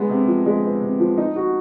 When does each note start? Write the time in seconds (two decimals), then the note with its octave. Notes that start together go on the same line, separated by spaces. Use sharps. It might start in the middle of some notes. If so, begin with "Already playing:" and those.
Already playing: G#3 B3
0.09 C3
0.28 F3
0.46 G#3
0.64 B3
0.82 C3
1.00 F3
1.18 D#4
1.36 F#4